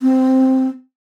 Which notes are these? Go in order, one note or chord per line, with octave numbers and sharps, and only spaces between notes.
C4